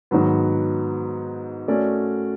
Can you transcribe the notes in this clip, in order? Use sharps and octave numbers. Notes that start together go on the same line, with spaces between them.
G#2 D#3 F#3 B3
A3 C#4 F#4 A#4 D5